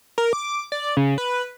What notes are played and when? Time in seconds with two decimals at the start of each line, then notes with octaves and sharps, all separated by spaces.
0.18 A#4
0.33 D6
0.72 D5
0.97 C#3
1.18 B4